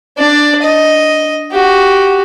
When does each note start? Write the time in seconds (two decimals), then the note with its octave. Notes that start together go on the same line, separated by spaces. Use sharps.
0.17 D4 D5
0.62 D#5
1.51 F#4 G4